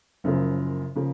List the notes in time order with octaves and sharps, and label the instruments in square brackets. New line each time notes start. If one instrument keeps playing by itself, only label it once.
[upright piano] F#1 F#2 C#3 F3 A#3
C#3 F3 A#3